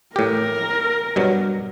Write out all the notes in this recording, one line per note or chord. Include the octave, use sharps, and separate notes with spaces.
A2 G4 A#4
G2 B2 F#3